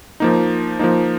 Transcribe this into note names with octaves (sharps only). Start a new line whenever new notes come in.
F3 A#3 D#4
F3 A#3 D#4